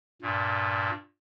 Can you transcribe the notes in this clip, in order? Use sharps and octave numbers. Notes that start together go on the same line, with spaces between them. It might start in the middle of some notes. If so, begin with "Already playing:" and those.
G2 A#2